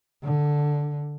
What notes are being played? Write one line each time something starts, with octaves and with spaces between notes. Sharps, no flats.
D3